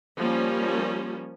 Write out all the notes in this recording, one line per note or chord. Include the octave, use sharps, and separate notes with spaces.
F3 G3 A#3 C#4